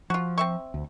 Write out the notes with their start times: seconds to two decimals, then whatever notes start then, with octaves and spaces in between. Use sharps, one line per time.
0.10 F3 F4 F#4
0.38 C4 E5 C#6
0.74 D2